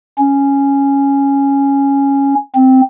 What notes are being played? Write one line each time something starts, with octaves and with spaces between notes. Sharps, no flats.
C#4
C4